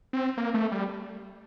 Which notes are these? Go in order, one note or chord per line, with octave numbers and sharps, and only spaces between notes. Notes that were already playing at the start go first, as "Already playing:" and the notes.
C4
A#3
A3
G3